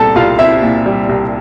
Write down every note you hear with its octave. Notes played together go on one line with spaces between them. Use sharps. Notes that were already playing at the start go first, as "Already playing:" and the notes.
Already playing: C2 A#2 G3 C4 A4 A5
C2 F4 F5
C4 E4 E5
A#2
G3
C2